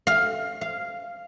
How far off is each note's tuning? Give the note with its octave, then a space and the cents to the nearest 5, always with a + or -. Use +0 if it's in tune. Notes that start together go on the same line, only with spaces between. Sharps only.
F5 +10
F5 -10